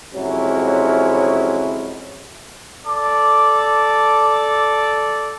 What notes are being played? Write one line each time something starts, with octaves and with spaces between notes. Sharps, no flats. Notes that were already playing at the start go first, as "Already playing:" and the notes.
F2 C3 F#3 G#3 C#4 E4
A4 D5 D6